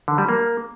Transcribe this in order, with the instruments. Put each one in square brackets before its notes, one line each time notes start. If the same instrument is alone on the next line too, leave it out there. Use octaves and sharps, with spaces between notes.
[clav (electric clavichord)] D3
G3
A#3